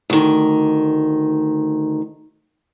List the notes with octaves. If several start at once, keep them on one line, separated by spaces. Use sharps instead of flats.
D2 D#3